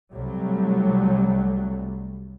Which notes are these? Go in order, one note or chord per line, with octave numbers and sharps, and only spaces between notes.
C2 F#3 G3 A3